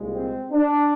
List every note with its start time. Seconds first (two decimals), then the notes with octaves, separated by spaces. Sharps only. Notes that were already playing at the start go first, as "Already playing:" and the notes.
Already playing: C2 A#2 G#3
0.13 C4
0.52 D4